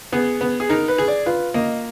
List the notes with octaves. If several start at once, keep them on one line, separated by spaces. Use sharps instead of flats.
B3 G#4
B3
G#4
D#4 A#4
B4
G#4
D5
F4 B4
A#3 D#5